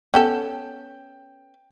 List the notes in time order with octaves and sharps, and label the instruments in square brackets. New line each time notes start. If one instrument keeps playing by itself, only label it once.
[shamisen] B3 C#4 A4 [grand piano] G5